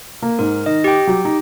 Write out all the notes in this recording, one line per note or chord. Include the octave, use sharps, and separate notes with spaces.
A#3
G#2 A#4
D#3 D#5
G4 G5
F#3
D#4